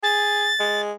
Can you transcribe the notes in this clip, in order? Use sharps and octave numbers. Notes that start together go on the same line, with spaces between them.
G#4 A6
G#3